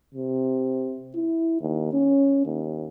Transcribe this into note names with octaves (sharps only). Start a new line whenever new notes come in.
C3
E4
D#2
C#4
D#2